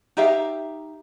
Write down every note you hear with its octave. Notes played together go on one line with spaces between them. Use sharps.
D#4 G4 E5 F5